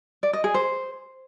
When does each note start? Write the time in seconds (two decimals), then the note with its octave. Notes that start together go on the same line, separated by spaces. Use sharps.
0.23 D5
0.33 D#5
0.44 G#4
0.54 C5